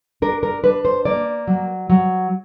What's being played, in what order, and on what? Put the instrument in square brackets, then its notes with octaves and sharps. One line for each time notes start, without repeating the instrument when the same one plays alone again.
[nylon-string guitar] D4 A#4
A#4
D4 B4
C5
A#3 D5
F#3
F#3